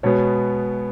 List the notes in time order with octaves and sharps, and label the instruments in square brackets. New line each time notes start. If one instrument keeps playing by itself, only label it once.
[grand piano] B2 G#3 B3 C#5